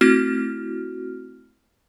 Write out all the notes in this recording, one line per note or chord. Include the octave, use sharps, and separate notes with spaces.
A3 C4 E4 F#4 F6